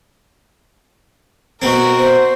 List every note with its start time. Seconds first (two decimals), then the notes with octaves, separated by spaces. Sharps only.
1.62 B2 B3 C4 F#4 A#4
1.98 C5